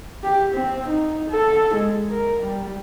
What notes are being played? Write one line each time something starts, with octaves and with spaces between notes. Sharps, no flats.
G4
C4
D#4
A4
G#3
A#4
G3